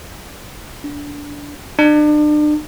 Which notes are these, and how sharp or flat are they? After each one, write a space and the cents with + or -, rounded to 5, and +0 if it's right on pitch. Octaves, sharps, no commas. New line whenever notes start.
D4 -20
D4 +35